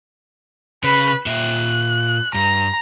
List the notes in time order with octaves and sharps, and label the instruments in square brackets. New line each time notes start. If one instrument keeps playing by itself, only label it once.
[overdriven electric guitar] C#3 [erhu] B4
[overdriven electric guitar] A#2 E5 [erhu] F#6
[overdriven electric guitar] G2 [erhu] A#5